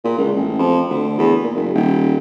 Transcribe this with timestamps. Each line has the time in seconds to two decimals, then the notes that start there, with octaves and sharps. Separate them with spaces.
0.04 A#2
0.18 C#2
0.36 A1
0.59 F2
0.90 D2
1.18 E2
1.44 A#2
1.55 F#1
1.75 D#1